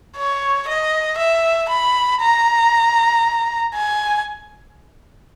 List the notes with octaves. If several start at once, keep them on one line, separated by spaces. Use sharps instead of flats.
C#5
D#5
E5
B5
A#5
G#5